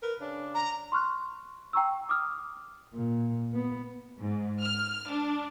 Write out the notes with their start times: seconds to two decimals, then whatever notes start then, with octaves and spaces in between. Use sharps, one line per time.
0.01 A#4 B4
0.19 C#3 D4
0.55 A#5
0.92 C6 C#6 F6 F#6
1.73 G5 A#5 C#6 E6
2.09 D6 D#6 F6
2.94 A#2
3.54 B3
4.19 G#2
4.60 F6
5.09 D4